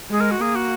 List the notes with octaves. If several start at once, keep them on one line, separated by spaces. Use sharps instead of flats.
G#3 G#4
A#4
F#4
A#3 G#4
F#4